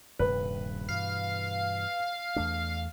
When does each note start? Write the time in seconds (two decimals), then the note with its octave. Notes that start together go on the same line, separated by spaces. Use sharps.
0.19 D#1 G2 C3 B4
0.89 G2 B2 E3 F5
2.36 E2 A3 D4